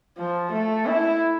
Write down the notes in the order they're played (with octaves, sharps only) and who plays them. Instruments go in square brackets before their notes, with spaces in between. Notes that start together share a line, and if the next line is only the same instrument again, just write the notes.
[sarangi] F3
A3
E4